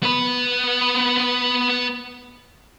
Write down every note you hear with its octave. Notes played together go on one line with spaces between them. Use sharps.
B3 B4